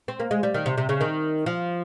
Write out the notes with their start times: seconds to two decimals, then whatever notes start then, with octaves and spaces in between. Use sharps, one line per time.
0.08 C4
0.20 A#3
0.31 G#3
0.43 G3
0.54 D#3
0.66 C3
0.78 C3
0.89 C#3
1.01 D#3
1.46 F3